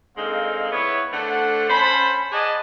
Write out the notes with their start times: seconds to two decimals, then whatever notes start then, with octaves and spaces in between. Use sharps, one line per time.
0.17 D3 G#3 A#3 C4 D#4 F5
0.72 B3 E4 C#5
1.13 D3 A3 D4 C5 F#5
1.70 C#4 C5 A5 B5
2.31 G#4 D5 D#5 F#5 G#5 A5